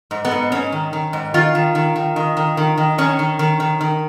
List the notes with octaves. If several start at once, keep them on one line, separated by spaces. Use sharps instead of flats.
G#2
B3
G#2
G#2 C#4
D#3
D#3
G#2
D#3 F4
D#3
D#3
D#3
D#3
D#3
D#3
D#3
D#3 C#4
D#3
D#3
D#3
D#3